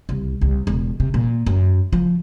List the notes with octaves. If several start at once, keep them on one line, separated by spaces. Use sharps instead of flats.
C2
C2
E1
C3
A#2
F#2
F3